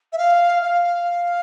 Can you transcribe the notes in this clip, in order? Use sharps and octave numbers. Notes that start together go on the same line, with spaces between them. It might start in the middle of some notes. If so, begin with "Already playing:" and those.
E5
F5
F5